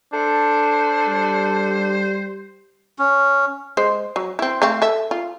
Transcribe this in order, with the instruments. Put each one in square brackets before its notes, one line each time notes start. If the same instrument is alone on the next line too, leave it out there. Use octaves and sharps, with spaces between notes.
[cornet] D4 [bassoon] A4 [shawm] C5
[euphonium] G3
[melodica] C#4
[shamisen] G#3 C5
F#3
C4 E4
A3 C4 F5
A4 E5
F4